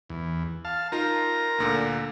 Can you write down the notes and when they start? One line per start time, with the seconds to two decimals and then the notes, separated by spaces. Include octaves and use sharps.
0.10 E2
0.65 F5 A5
0.92 D#4 F4 A#4 A#5
1.58 D2 A#2 D3